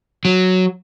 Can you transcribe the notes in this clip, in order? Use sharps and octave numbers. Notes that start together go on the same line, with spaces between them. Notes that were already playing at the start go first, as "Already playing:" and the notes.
F#3